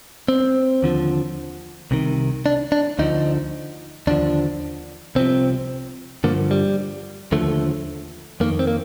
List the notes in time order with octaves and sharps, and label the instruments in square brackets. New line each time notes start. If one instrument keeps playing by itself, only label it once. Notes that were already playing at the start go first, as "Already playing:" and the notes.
[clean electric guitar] C4
D#2 D3 F3
C2 C3 D#3
D4
D4
D2 D3 F3 D#4
D#2 D3 F3 D4
C2 C3 F3 C4
G2 D3 F3 A#3
G3
D#2 D3 F3 A3
F2 D#3 A#3
C4
A#3